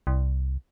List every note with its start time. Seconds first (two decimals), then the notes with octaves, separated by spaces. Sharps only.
0.07 C2